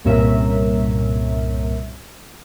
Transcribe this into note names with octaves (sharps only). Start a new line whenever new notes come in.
C2 G2 A#2 C#4 A#4 E5